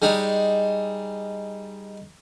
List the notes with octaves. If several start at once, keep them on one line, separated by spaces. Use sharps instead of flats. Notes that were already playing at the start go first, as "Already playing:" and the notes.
G3 G#3 D#4